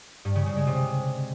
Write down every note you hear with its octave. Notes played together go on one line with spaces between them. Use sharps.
G2
C#3
C#3
G#3
C3